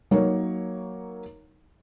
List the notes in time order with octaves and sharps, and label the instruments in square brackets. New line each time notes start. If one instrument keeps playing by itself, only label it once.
[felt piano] F#3 A#3 D#4 A#4 C#5